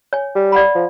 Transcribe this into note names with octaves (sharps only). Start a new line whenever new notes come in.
C#5 G#5
G3
D5 F#5 B5
F3